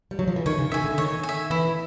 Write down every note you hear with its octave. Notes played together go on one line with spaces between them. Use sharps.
G3
F#3
F3
E3
D#3 C#5
C#3
D#3 E5 G#5
D3
D#3 C#5
G#5
E5
E3 E4